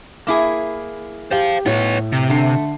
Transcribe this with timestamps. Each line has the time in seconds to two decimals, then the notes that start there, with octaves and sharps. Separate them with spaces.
0.27 A#3 E4 G#4
1.31 G4 C5 F5
1.66 A2 B3 C#5
2.12 C3
2.30 D3 A3 C7